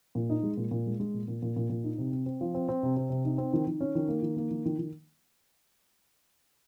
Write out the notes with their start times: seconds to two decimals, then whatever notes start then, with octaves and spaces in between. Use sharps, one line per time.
0.15 A#2
0.30 D#4
0.43 G#3
0.57 A#2
0.71 A#2
0.87 G#3
1.00 G#3
1.14 A#2
1.28 A#2
1.42 A#2
1.56 A#2
1.70 A#2
1.84 D#4
1.98 C3
2.12 C4
2.26 C4
2.41 F3
2.54 C4
2.68 C4
2.83 C3
2.97 C4
3.10 C3
3.25 D#4
3.38 C4
3.53 D#3
3.67 D#3
3.81 C#4
3.95 D#3
4.08 A#3
4.22 D#3
4.37 A#3
4.51 D#3
4.65 D#3
4.79 D#3